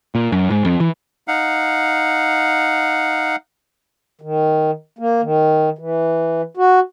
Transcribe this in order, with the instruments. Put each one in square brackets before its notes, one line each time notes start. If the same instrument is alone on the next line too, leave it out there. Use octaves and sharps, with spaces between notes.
[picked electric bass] A#2
F#2
G#2
F2
E3
[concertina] D#4 F5 F#5
[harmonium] D#3
A#3
D#3
E3
F#4